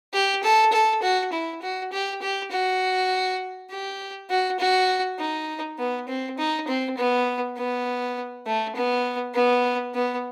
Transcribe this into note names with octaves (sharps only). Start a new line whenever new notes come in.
G4
A4
A4
F#4
E4
F#4
G4
G4
F#4
G4
F#4
F#4
D#4
B3
C4
D#4
C4
B3
B3
A3
B3
B3
B3